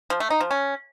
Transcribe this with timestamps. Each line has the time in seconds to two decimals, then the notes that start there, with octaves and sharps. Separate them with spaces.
0.10 F3
0.20 A3
0.30 D#4
0.41 F3
0.51 C#4